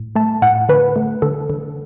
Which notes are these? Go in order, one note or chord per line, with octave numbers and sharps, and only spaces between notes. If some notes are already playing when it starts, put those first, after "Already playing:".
Already playing: A2
A3 A5
A2 F#5
D3 B4
A3
D3 A4
D3